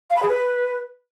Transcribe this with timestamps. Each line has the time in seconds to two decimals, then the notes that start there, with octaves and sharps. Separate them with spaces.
0.10 F5
0.16 B5
0.22 G#4
0.29 B4